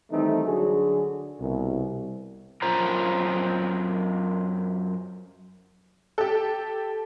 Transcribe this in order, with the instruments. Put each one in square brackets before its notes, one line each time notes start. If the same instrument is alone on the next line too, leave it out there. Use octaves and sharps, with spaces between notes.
[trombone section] D#3 E3 G3 A3 C4 D#4
D3 F#3 D4 F#4 G#4
C2 B2
[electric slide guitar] F#2 F4 A#4 C5 A#5
[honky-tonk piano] G4 A4